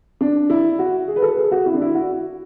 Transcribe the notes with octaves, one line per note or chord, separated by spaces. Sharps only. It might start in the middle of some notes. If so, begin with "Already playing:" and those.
D4
E4
F#4
G#4
B4
A4
G#4
F#4
E4
D4
E4
F#4